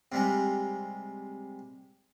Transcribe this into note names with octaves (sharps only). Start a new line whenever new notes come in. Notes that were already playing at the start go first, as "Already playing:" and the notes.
C3 G3 G#3